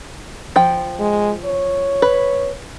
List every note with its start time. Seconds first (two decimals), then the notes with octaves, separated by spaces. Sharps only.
0.56 F3 G5
0.99 G#3
1.45 C#5
2.02 B4